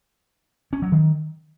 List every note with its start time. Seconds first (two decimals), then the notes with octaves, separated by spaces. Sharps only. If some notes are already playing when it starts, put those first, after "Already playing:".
0.73 C#4
0.82 F#3
0.92 D#3